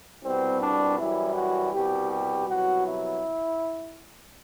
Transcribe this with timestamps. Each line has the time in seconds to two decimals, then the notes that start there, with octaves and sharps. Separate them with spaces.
0.22 C2 B2 G3 C4
0.60 D4
0.98 F#2 E3 G3 E4
1.35 F#4
1.72 C2 B2 G3 G4
2.10 G4
2.48 C2 B2 F#3 F#4
2.85 E4